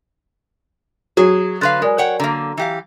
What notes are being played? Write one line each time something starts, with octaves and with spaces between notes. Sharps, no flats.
F#3 G#4
D3 B4 F5 C6 F#6 A6
G#3 A#4 D5 G#5
C#5 F#5 G5
D3 A#3 A#5
E3 G4 F5